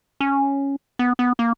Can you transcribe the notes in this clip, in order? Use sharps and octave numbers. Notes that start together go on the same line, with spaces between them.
C#4
B3
B3
A#3